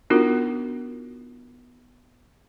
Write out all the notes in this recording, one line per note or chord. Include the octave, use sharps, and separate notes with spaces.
B3 D4 D#4 F4 F#4 A#4